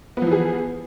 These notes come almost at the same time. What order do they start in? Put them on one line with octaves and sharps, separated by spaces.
B3 F3 E3 G#4